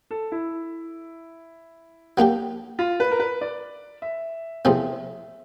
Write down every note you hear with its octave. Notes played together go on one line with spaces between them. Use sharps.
A4
E4
F#3 A#3 D4 G4
F4
B4
A#4
B4
D5
E5
E2 C3 F3 A3 C#4 E5